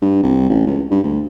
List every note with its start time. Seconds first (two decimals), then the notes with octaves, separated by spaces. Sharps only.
0.01 G2
0.23 C2
0.49 A1
0.67 C#2
0.90 G2
1.04 D2